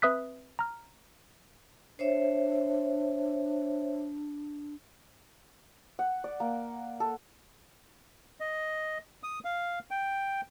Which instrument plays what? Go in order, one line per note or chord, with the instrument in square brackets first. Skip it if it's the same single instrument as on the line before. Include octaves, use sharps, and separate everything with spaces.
[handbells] C4 B4 E5 D#6 F#6 B6
A#5 F6
[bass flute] D4 [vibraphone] C5 C#5 E5
[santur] F#5
D5
A#3
A4
[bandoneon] D#5
D#6
F5
G5